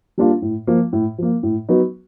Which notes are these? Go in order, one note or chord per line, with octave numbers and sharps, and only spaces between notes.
G3 A#3 D4 F4
A2
F3 A#3
A2
F3 A#3
A2
F#3 B3 D#4 F#4